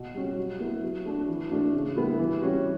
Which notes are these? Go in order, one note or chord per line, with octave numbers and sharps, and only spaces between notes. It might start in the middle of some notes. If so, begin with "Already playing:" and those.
Already playing: B2
G3 C#4 F#4
F#3
B3 E4
F#3
A3 D4 F#4
E3
A3 D4 F#4
C#3
G3 B3 E4
E3
G3 C#4 F#4